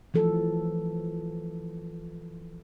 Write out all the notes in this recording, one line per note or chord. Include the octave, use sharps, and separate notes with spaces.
E3 F3 A4